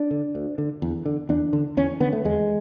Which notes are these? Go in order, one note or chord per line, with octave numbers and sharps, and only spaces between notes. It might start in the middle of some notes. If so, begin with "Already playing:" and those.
Already playing: D4
D3
D2
D3
E2
D3
E2 D4
D3
E2 C#4
D3 B3
A3
E2 G#3